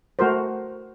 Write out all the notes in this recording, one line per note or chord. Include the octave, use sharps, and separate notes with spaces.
A3 F#4 A#4 C5